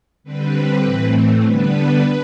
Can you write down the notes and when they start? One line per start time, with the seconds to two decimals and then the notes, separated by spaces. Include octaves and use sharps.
0.24 D3 G3 C4 B4
0.83 A2 E3 A3 C4
1.43 D3 G3 B3 D4 B4